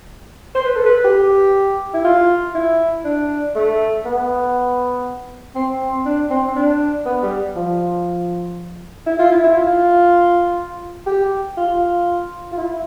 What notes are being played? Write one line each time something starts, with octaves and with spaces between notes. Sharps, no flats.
C5
B4
A4
B4
G4
E4
F4
E4
D4
A3
B3
C4
D4
C4
D4
B3
G3
F3
E4
F4
E4
E4
F4
G4
F4
F4
E4